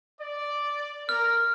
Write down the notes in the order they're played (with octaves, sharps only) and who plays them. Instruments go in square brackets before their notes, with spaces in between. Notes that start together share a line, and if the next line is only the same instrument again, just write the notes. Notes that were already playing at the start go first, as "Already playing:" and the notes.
[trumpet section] D5
[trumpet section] A#4 [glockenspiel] F6